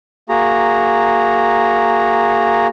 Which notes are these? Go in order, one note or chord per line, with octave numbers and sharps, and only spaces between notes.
A#3 F#4 G#4 A#5